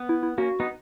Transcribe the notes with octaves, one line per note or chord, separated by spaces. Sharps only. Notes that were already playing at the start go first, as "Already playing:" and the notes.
Already playing: B3
E4
E4
A#3 C#4 F#4
B3 D#4